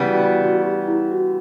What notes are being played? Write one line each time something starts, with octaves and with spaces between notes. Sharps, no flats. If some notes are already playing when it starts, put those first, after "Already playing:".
Already playing: C#3 E3 G3 B3
F#4
F#4
F#4
G4
E4
F#4